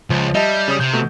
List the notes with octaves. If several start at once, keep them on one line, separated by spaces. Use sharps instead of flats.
C#2 F3
G3 D#5 E5 A5
C#3 C#5 D#6
C3 G6
B2 A3